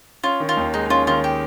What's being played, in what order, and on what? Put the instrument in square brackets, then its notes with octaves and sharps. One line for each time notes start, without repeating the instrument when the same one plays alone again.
[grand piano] C#4 [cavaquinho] F4
[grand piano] D#3
[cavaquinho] F4
[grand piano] D#2
[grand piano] G#3 [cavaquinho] D#4
[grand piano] C#4 [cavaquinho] F4
[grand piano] D#3 [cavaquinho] F4
[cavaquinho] G4